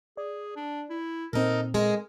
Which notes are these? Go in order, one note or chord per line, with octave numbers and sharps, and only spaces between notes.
G#4 D5
D4
E4
A#2 C4 D#4 A4 A#4
G#3 G#4 A#4